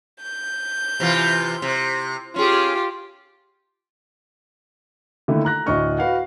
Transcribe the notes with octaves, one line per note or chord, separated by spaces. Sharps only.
G6
C3 E3 F4
C3
C#4 F4 G4 G#4
D3 D#3 A3 A#3 E4
A#5 F#6 A#6
D2 A2 D4 D#5 C#6 F6
F#4 B4 F5 F#5